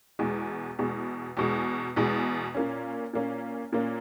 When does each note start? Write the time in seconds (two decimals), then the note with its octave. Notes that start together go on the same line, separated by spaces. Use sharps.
0.19 E2 B2 G#3
0.79 E2 B2 G#3
1.37 E2 B2 G#3
1.96 E2 B2 G#3
2.54 A#2 A#3 C#4
3.13 A#2 A#3 C#4
3.72 A#2 A#3 C#4